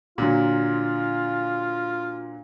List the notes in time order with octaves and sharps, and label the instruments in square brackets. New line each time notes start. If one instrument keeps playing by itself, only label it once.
[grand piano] A#2 D3 F#3 [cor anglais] F4